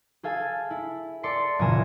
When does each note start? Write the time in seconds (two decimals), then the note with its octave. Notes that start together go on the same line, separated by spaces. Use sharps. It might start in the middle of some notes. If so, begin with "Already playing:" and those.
0.23 G#4 A4 F5 G#5
0.70 E4
1.23 A4 D5 C6 C7 C#7
1.59 F#1 A#2 E3 G#5 A#5 E7